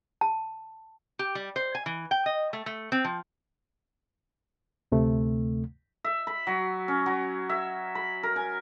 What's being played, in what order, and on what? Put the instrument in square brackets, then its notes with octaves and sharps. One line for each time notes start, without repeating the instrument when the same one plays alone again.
[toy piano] A5
[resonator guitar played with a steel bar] G4
G3
C5
G#5
E3
G5
D#5
A3
A3
C4
F3
[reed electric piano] D2 C3 A3
[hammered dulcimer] E5
B5
F#3
C#4
F#3
E5
B5
A#4
G#5